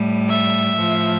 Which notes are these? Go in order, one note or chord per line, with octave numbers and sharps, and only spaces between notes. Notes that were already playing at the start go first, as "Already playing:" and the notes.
Already playing: A2 G3
E5
A2 F3